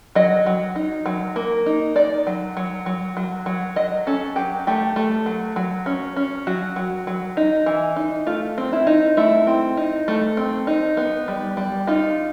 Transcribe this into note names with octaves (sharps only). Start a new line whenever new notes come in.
F#3 D#5
F#3
D#4
F#3
A#3
D#4
D#4 D5
F#3
F#3
F#3
F#3
F#3
F#3 D#5
C#4 A4
F#3 G4
A3 G4
A3
F#3
F#3
C#4
C#4
F#3 F#4
F#3
F#3
D#4
E3
D#4
A3 F4
C4
E4
D#4
A3 E4
C4
D#4
A3
C4
D#4
B3
G3
G3
D#4 F4